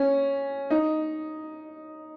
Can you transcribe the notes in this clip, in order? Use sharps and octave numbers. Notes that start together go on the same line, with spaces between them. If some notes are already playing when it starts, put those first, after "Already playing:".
Already playing: C#4
D#4